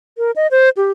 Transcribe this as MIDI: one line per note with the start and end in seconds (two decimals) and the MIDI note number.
0.18 0.31 70
0.36 0.47 75
0.51 0.69 72
0.77 0.91 67